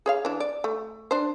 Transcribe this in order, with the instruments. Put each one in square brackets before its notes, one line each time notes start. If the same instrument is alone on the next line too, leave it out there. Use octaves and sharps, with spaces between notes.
[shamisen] G#4 C#5 F5
E3 D4
D5
A3
D4 C5